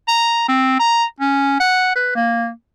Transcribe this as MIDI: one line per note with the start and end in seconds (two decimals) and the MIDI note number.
0.08 0.45 82
0.48 0.78 60
0.80 1.04 82
1.20 1.56 61
1.60 1.93 78
1.95 2.12 71
2.15 2.50 58